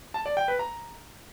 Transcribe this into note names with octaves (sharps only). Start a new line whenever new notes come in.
A5
D5
G5
B4
A#5